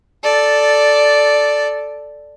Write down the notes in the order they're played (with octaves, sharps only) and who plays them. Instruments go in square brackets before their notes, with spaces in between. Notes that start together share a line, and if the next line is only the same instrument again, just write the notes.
[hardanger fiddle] A4 D5